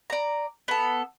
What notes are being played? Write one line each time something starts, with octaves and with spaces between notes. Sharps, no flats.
D5 A#5
B3 A4